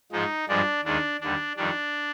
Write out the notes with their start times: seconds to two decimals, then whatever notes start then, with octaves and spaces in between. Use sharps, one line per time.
0.12 G#2 F3 G#3 D#4
0.49 G2 F3 G#3 D4
0.84 D#2 D#3 G#3 D4
1.21 D#2 D3 G3 D4
1.57 F2 D#3 G3 D4